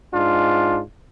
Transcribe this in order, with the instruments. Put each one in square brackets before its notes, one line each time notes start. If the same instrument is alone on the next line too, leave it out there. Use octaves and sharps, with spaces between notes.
[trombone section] G#2 D4 F4